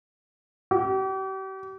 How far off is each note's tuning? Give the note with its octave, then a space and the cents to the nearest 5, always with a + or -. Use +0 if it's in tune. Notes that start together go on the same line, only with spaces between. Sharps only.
G4 -40